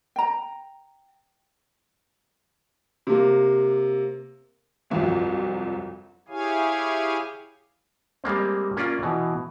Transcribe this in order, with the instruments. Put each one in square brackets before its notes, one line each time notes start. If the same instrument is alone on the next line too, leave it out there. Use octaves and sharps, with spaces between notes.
[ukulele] G5 A#5
[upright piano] C3 A#3
[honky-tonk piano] G1 C2 F2 F3 F#3
[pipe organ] E4 G4 G#4 C#5 F5 G#5
[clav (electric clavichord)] G3 G#3 A#3 C4
A#3 C#4 F4 D5
B2 E3